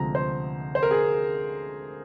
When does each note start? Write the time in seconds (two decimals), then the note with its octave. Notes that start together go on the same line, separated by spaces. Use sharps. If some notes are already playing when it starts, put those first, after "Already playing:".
Already playing: D2 C3 F3 G#3 C4 A#5
0.15 C5
0.75 C5
0.83 A#4
0.91 G#4